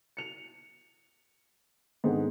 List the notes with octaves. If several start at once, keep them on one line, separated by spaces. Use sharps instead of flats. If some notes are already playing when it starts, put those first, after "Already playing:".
C#7 F7
G#2 D3 D#3 B3 C4 G#4